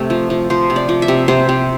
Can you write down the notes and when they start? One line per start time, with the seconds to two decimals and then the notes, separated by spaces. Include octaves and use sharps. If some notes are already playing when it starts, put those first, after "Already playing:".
Already playing: C3 A3 A4
0.10 F3
0.30 F3
0.50 F3 C5
0.70 C3
0.76 D5
0.89 F3
1.02 E5
1.08 C3
1.28 C3 C5
1.49 C3